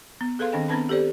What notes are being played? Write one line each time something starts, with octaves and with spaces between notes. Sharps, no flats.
B3
G#4 A4 B4 F5 C6
D#3 C4 D4 D#5 G5
B3 C4 D4 B4 A5 B5
G4 A4 C5 D5